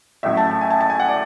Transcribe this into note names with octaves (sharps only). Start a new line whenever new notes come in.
A1 A2 F#3 E5
A5
A5
G#5
A5
A5
G#5
F#5
D5